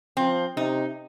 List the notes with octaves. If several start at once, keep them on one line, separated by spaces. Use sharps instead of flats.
F3 C4
C3 D#4